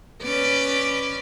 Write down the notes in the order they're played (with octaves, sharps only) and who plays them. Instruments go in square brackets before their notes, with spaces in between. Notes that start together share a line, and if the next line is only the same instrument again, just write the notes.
[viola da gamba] C#4 B4 D5